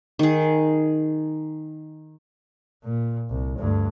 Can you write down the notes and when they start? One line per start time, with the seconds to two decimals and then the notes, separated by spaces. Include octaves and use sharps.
0.19 D#3 G#4
2.84 A#2
3.30 C2
3.59 D2 G2